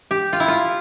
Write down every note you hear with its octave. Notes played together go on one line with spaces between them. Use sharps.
G4
F4
E4
F4